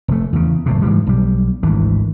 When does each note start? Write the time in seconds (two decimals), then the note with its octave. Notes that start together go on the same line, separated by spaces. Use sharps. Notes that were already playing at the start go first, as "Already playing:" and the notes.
0.08 F1 A3
0.33 E2 C#3
0.66 F#1 A2 C3
0.82 G#2 E3 F3 G3
1.07 B1 G3
1.63 G#1 D2 E3